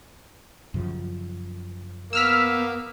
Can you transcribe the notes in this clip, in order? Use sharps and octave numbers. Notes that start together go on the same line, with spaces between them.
F#2 C#3 F3
A#3 B3 E6 F6 B6